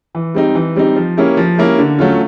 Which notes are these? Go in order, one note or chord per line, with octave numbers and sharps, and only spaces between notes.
E3
G3 C4 D#4
E3
G3 C4 D#4
F3
A#3 C#4 E4 G4
F3
A#3 C#4 E4 G4
D3
F#3 A3 C#4 F4